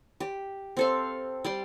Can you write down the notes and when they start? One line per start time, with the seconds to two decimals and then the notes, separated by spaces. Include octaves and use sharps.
0.20 G4
0.77 C4 A4 F5
1.45 G3 D5 C6